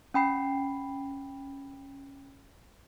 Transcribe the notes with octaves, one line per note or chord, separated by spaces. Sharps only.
C#4 G5 B5 C7